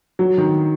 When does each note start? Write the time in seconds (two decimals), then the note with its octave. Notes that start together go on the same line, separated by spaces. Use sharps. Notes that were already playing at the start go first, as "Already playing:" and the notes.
0.19 F#3
0.38 D#3